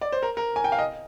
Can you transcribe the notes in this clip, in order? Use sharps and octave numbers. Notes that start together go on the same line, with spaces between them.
D5
C5
A#4
A#4
G#5
G5
F5
D#5